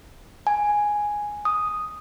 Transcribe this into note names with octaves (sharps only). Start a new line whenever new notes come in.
G#5
D#6